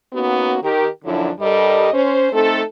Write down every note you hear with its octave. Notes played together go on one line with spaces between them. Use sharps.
A#3 B3 C#4 D#4 F#4
D#3 G4 A#4
F#2 D3 F3 F#3 D4 E4
G2 G3 A4 A#4 D#5
C#4 C5
A3 C4 D#4 A4